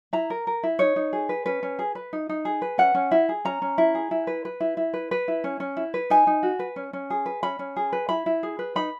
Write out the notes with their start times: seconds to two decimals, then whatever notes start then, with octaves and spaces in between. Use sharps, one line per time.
0.13 E4 A#5
0.30 A#4
0.47 A#4
0.63 E4
0.79 D#4 C#5
0.96 D#4
1.13 G#4
1.29 B4
1.46 C#4 B4
1.63 C#4
1.79 G#4
1.95 B4
2.13 D#4
2.29 D#4
2.45 G#4
2.62 B4
2.78 C#4 F#5
2.95 C#4
3.11 E4
3.29 G#4
3.45 C#4 A#5
3.62 C#4
3.78 E4
3.95 G#4
4.11 E4
4.27 B4
4.45 B4
4.61 E4
4.77 E4
4.94 B4
5.11 B4
5.28 E4
5.44 C#4
5.60 C#4
5.77 E4
5.94 B4
6.10 D#4 G#5
6.27 D#4
6.43 F#4
6.59 B4
6.76 C#4
6.93 C#4
7.10 G#4
7.26 B4
7.43 C#4 B5
7.59 C#4
7.77 G#4
7.93 B4
8.09 E4 B5
8.26 E4
8.43 G#4
8.59 B4
8.76 D#4 B5